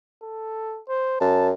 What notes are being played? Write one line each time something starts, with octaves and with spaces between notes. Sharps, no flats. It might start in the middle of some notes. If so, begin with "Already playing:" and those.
A4
C5
F#2 A5